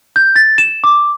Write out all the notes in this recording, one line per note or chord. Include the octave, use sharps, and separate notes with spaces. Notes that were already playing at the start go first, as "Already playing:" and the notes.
G6
A6
E7
D6